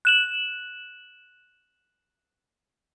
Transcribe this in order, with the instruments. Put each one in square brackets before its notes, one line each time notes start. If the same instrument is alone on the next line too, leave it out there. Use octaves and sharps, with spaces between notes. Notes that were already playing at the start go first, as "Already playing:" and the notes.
[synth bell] F#6 E7 F#7